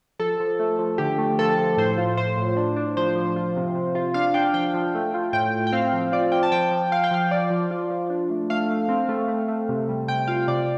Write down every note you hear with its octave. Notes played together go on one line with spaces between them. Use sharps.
F3 A4
F3
A3
F3
D3 G4
A3
F3 A4
F3
A2 C5
F4
A2 C5
A2
D4
D4
F3 C5
F3
F4
C3
C3
F4
D4 F5
D4 G5
F3 G5
F3
A3
F4
A2 G5
A2
G5
C4 F5
F3
F4 D5
F4 G5
A5
F3 G5
F3
F3 F5
G5
F3 F5
F3 D5
F3
F4
F3
D4
A3
A3 F5
A3
C4
A3
A3
A3
C3
G3
C3 G5
F4 F5
C3 D5